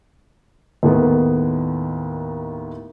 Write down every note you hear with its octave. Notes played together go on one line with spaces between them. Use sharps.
D#2 A2 D#3 B3